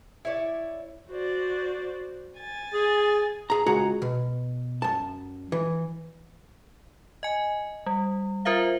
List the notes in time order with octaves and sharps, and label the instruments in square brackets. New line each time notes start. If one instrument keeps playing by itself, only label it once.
[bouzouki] E4 C#5 D5
[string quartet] F#4 C5 D5
G#5 A6
[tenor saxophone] G#4
[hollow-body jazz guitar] G#4 A#5
C#2 F#4 G#4 F#5 A#5
B2
F#2 A5
E3
[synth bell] D#5 G#5
G3
F4 A#4 C5 E5 F5